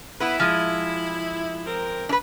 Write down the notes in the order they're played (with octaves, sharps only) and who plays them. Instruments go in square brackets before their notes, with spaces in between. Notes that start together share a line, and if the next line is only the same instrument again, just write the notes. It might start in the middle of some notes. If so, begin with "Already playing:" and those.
[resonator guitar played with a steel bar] B3 B4 [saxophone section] E4
[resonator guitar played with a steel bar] F3 G#3
[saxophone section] C4 A#4
[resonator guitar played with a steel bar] D4 B4